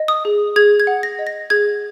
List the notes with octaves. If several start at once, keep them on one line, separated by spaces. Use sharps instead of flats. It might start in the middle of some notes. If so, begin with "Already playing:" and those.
Already playing: D#5
D#6
G#4
G#4 G#6
G#6
F#5
A#6
D#5
A#6
G#4 G#6